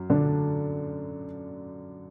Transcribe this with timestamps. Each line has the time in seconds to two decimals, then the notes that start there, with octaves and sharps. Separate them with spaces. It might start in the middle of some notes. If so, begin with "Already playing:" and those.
Already playing: F#2 F#3
0.10 D3 D4